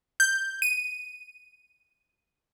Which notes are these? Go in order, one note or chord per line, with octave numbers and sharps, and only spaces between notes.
G6
D#7